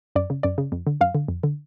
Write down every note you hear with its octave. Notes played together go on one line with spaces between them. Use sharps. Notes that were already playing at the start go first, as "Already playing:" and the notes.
F#2 D5
C#3
F#2 D5
C#3
F2
D3
F#2 F5
D3
F2
D3